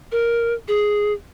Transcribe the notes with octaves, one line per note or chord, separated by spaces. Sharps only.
A#4
G#4